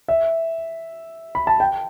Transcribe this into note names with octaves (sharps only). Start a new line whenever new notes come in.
E5
B5
A5
G5